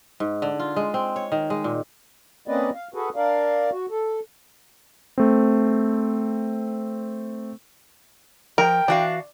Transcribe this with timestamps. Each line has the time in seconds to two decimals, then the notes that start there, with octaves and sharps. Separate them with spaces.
0.20 G#2
0.42 D3
0.59 F4
0.76 G#3
0.94 C4
1.16 C#5
1.32 D#3
1.50 G#3
1.64 A#2
2.48 A#3 C4 C#4 B4 D5 D#5
2.75 F5
2.94 F#4 G#4 A4 B4
3.16 D4 A#4 D5 F5
3.72 F#4
3.91 A4
5.18 A3 C4
8.58 F3 A#4 G5
8.88 E3 D4 F#4 F5